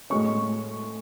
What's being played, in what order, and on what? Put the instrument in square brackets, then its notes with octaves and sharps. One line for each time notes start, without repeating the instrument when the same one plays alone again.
[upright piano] A2 G#3 C#4 C#6